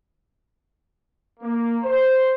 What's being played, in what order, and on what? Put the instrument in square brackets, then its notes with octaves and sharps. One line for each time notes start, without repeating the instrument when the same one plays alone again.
[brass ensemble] A#3
C5